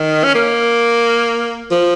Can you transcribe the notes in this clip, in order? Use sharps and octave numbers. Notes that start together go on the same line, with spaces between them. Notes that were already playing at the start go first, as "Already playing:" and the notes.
Already playing: D#3
C#4
A#3
F3